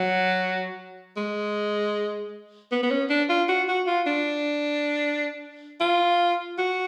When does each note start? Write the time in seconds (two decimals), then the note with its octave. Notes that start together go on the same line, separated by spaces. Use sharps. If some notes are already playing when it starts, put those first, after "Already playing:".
Already playing: F#3
1.17 G#3
2.72 B3
2.83 B3
2.90 C#4
3.10 D4
3.29 F4
3.49 F#4
3.68 F#4
3.87 F4
4.07 D4
5.80 F4
6.58 F#4